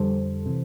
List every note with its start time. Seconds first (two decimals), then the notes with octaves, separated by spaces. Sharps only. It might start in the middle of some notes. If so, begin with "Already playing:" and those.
Already playing: F2 D3 G3 A4 C5
0.46 C3 E3